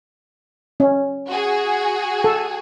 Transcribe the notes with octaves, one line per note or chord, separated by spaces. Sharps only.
C#4
F#4 G#4
A4